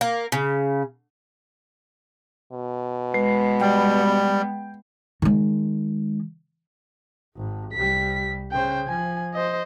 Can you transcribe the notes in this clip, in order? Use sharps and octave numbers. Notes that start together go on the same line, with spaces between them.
A#3
C#3
B2
G#3 B3 B4 C7
G3 G5
D#3 G#3
G#1
C2 G3 B6
C#3 C5 G5
F3 G#5
C5 D#5